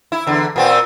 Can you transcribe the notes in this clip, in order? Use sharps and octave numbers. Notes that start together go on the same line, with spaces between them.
E4
E2 D3
A#2 B3 C4